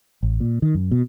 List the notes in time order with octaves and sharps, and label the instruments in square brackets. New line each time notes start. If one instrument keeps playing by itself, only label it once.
[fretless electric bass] A1
A#2
D#3
F#2
B2